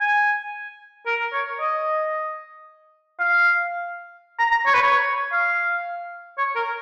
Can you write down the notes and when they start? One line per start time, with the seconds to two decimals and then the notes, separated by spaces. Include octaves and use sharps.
0.01 G#5
1.06 A#4
1.33 C#5
1.60 D#5
3.20 F5
4.39 A#5
4.52 A#5
4.66 C#5
4.74 B4
4.82 C#5
5.32 F5
6.38 C#5
6.56 A#4